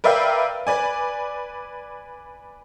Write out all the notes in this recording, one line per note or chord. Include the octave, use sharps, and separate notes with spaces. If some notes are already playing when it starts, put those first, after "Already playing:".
A#4 B4 D5 E5 F5 G5
B4 D5 G#5